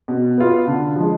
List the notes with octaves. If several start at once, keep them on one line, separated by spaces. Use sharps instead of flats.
B2
B3 F4
D3
F3 G#3